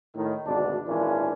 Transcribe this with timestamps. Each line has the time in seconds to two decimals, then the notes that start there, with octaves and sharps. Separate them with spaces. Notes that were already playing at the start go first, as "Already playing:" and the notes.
0.16 A2 D#3
0.45 G#1 D2 B2 D4
0.87 G#1 A#2 E3 A#3 C#4 D4